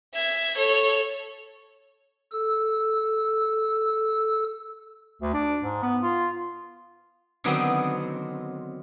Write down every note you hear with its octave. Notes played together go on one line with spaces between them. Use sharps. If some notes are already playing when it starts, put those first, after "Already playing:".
E5 G#6
A4 C#5
A4 E6
D2
D4
G#2
B3
F4
D3 D#3 F#3 B3 C4